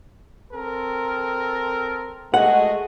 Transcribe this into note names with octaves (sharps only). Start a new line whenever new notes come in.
C4 A4 A#4
G#3 A3 F#4 F#5